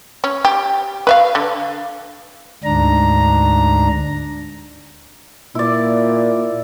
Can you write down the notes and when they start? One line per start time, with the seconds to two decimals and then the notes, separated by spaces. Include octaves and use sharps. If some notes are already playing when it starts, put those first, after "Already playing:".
0.24 C#4
0.45 G4
1.07 B4 E5 F5
1.35 D3
2.64 D2 G#2 D4 A#5
5.55 A#2 E4 D5